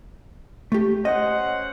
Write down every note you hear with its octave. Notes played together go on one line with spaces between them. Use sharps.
A3 G4
C#4 C5 D#5 F#5